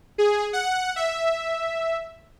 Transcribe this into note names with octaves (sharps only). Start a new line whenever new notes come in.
G#4
F#5
E5